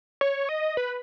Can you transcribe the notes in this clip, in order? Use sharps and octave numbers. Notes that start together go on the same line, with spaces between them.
C#5
D#5
B4